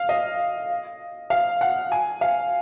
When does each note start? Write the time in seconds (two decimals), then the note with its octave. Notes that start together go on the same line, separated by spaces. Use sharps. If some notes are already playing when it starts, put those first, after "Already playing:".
Already playing: F5
0.09 D#5
1.30 F5
1.61 F#5
1.92 G#5
2.21 F5